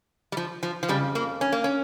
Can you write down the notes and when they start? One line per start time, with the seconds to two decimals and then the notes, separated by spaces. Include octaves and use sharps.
0.32 G3
0.37 F3
0.63 F3
0.83 F3
0.89 F2 C#3 G3
1.15 A#3
1.41 C#4
1.52 A#3
1.64 C#4